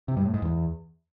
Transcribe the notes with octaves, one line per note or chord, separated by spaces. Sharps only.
C3
G2
A2
G#2
E2